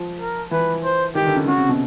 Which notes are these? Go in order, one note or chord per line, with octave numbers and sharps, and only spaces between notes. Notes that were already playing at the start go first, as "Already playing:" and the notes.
Already playing: F3
A#4
E3 B4
C5
D#3 G4
D3
C#3
C#3 F#4
C3
B2